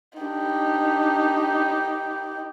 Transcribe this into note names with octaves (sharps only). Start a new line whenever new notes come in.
D4 D#4 G4